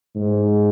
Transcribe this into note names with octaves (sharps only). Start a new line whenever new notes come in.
G#2